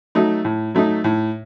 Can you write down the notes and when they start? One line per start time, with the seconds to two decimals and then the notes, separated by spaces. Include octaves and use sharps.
0.15 F#3 A3 D#4
0.45 A2
0.75 F#3 A3 D#4
1.04 A2